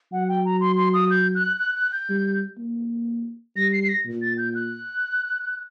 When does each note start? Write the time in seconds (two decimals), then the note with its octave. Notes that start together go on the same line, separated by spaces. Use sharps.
0.12 F#3 F#5
0.28 G5
0.45 A#5
0.60 C6
0.77 C6
0.94 D#6
1.10 G6
1.35 F#6
1.59 F#6
1.76 F#6
1.92 G6
2.09 G3
2.58 A#3
3.56 G3 A#6
3.73 C7
3.83 C7
3.89 A#6
4.06 A#2
4.22 A6
4.38 G6
4.55 F#6